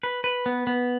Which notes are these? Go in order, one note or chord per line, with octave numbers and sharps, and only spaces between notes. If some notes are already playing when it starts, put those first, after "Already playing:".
B4
B4
B3
B3